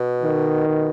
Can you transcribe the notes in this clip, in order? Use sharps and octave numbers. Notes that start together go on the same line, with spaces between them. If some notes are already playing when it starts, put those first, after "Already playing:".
Already playing: B2
D#3
B2